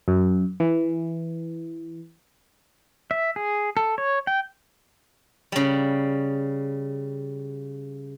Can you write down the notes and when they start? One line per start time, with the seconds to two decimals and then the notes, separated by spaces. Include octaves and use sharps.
0.08 F#2
0.60 E3
3.11 E5
3.36 G#4
3.77 A4
3.98 C#5
4.27 G5
5.52 C#3 G3